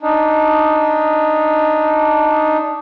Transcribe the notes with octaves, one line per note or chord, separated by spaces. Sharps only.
D4 D#4